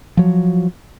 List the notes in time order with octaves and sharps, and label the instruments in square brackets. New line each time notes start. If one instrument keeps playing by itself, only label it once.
[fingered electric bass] F3 F#3